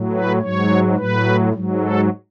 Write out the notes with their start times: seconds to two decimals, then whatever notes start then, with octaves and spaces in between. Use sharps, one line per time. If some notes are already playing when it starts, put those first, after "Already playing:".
Already playing: A2 F#3
0.12 B4
0.40 G#2 F#3 C#5
0.97 A2 F#3 B4
1.53 G#2 F#3
1.81 A4